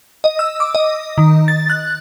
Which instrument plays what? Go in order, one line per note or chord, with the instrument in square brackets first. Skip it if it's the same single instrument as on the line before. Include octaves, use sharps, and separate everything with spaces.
[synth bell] D#5
E6
D6
D#5
D#3
A6
F#6